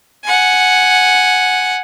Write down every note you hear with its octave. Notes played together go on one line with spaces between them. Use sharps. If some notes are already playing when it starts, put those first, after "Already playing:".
F#5 G#5